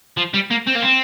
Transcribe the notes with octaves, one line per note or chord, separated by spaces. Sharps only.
F3
G3
A#3
C4
A#3
C4